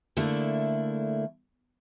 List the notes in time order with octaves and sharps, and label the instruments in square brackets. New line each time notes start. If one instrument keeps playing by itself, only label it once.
[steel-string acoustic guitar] D3 A3 A#3 D4 E4